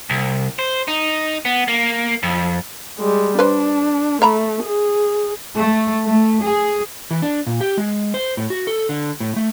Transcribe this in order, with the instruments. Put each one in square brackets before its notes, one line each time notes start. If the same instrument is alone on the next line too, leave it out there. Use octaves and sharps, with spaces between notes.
[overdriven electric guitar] C2
C5
D#4
B3
A#3
F2
[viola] G3 G#3
[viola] D4 [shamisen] B4 C5
[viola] A3 [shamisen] E5 A#5 B5
[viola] G#4
[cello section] A3
A3
G#4
[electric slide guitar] E3
D4
A#2
G4
G#3
C5
A2
F#4
A4
D3
A2
A3